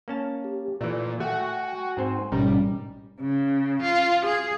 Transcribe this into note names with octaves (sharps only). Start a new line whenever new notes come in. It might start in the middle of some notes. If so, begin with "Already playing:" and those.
A#3 C#4 A5
G4
A#2 E3 A3 D5
A3 F#4 G5 G#5
G#2 C4 C5
A1 G#2 B2 G3 C#4 D#4 A#4
C#3
F4
G#4